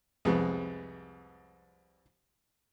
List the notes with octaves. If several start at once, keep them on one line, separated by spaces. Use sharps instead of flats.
C2 F2 G#3 B3